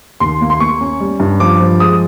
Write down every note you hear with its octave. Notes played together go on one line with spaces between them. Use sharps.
D#2 C6
A#3
C6
A#3 C#6
C#4
G3
G2
F3 D6
F3
G#3 D#6